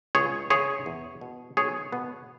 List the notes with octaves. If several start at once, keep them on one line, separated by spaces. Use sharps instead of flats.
C#2 G#4 C#5
C#3 E3 G#4 C#5
E2
B2
B1 G#4 C#5
B2 B3